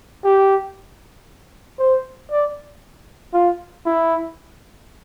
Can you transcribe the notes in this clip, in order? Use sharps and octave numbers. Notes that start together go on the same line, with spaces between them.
G4
C5
D5
F4
E4